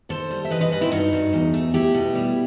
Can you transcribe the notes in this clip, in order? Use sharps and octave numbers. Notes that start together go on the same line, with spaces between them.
D#2 A4 C5
G3
E5
E3 B4 D#5
B4 D#5
G2 B4 D#5
C4 E4
G2 D#4 F#4
G2
E2
A3
A3 E4 G4
B2
G3